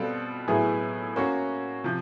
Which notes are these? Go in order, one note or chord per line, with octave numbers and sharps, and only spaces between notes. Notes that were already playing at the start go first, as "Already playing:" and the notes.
Already playing: B2 G3 C4 F4 A4
A2 F#3 B3 E4 G#4
A#3 C#4 F#4
C3 F3